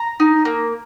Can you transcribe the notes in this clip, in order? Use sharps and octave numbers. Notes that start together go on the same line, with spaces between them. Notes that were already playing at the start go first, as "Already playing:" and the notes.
Already playing: A#5
D#4
A#3